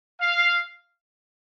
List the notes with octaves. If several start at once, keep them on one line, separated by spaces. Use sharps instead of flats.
F5